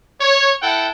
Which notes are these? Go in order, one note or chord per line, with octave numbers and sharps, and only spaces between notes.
C#5
E4 A4 F#5 G5